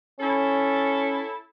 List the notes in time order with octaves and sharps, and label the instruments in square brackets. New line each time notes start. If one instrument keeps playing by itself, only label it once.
[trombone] C#4 [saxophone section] E4 A4